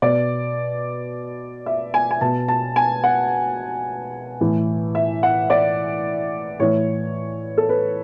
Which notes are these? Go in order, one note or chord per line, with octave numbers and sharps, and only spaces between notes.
B2 D5
E5
G#5
G#5
B2 A5
A5
G#5
F#5
A2 E3
E5
F#5
D5
A2 E3 C#5
A4
B4